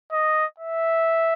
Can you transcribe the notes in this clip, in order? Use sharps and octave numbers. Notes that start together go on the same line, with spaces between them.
D#5
E5